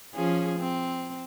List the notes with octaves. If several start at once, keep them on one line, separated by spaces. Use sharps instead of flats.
F3 C#4 G#4
C4